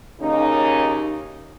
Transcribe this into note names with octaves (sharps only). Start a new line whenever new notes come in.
D#2 C#3 D#4